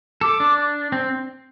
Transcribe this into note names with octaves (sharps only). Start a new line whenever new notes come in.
A4 D6
D4
C4